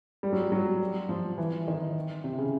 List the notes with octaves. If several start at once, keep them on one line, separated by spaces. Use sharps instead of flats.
G3
F#3
G3
F#3
G3
F3
E3
D#3
C3
C#3